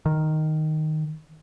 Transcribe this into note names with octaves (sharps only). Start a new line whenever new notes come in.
D#3